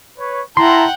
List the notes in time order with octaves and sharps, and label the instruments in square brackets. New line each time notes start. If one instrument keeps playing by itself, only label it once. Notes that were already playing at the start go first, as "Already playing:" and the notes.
[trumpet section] B4 C#5
[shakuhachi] E4 [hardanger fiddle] F#5 G5 [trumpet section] A5 A#5 [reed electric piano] C6